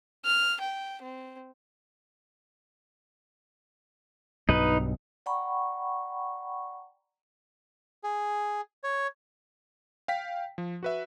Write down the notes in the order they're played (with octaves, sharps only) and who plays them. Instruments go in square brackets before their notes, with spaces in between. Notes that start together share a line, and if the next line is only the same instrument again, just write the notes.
[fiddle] F6
G5
C4
[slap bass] B1 G2 B2 [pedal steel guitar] D#4 B4
[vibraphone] D5 F#5 G5 A#5 B5 C#6
[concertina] G#4
C#5
[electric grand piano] F5 G5 B6
F3
F#4 B4 E5